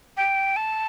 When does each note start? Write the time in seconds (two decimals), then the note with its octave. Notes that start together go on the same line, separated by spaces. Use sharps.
0.17 G5
0.56 A5